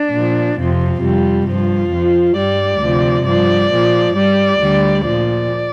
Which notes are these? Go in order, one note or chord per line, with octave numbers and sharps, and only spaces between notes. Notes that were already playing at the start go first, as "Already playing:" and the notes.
Already playing: D4
A#2 F3
F2 C3 F3 F4
F2 C3 G3
G2 F3 F4
F2 F3
G2 G3 D5
D2 C3 F3
G2 F3 D5
A#2 F3
G2 G3 D5
D2 D3 G3
A#2 F3 D5